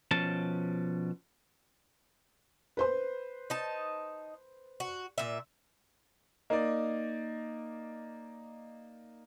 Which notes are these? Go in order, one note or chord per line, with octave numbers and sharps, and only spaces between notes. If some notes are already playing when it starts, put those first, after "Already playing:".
B2 F3 C#4 A5
B4 C5 C6
D#4 A5
F#4
A#2 E5
A#3 D#4 D5 D#5